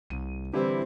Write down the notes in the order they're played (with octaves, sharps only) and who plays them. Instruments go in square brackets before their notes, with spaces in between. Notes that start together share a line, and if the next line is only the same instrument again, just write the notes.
[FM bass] C2 [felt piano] D#7
[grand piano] D3 E3 G3 [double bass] C4 [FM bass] E4 [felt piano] G4